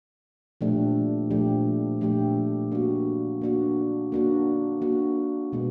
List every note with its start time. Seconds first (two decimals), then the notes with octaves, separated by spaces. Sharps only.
0.61 A#2 F3 A3 D4 G4
1.31 A#2 F3 A3 D4 G4
2.01 A#2 F3 A3 D4 G4
2.72 A#3 D4 F#4
3.41 A#3 D4 F#4
4.12 A#3 D4 F#4
4.81 A#3 D4 F#4
5.52 B2 G#3 B3